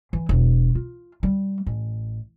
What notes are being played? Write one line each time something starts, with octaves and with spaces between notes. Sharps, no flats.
E3
E1
F4
G3
A1